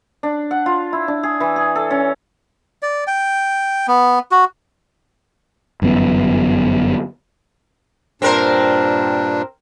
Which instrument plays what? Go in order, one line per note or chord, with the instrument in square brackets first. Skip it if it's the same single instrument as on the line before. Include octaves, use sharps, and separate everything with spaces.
[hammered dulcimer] D4
F#5
F4
E4
D4
G#4
E3
G#4
A4
C#4
[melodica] D5
G5
B3
F#4
[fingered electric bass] G1 F#2 E3 B3
[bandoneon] G2 A#2 D4 [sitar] C4 A#4 C5